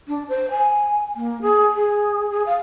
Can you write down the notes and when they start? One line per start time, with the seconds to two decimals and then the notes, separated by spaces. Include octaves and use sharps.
0.08 D4
0.29 C5
0.51 G#5
1.16 A#3
1.42 G#4
1.75 G#4
2.31 G#4
2.46 F5